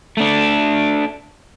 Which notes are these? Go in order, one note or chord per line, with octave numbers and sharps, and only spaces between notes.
A3 D4